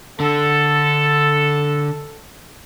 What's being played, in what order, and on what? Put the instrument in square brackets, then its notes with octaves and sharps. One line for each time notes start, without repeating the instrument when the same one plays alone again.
[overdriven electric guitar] D3 [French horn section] A4